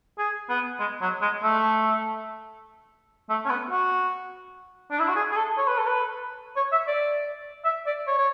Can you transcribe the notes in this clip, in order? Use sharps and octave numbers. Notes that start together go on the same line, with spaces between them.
G#4
B3
G#3
F#3
G#3
A3
A3
C#4
B3
F#4
D4
E4
F#4
G#4
G#4
A4
C#5
B4
A4
B4
C#5
E5
D5
E5
D5
C#5
C#5